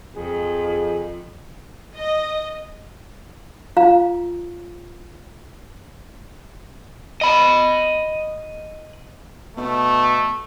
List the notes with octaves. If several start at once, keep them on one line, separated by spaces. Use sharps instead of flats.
F2 G#4
D#5
F4 F5 A#5
D#5 B5
B2 A3